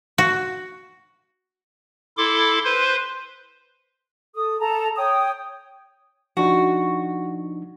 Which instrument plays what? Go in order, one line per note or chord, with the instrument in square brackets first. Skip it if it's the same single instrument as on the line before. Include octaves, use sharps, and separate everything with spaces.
[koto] F#4
[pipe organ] E4 A4 C6 D6
B4 C5 C6
[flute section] A4 D#6
A4 A5 A#5
C#5 G5 D#6
[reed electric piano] F3 D4 D#4 [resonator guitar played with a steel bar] F#4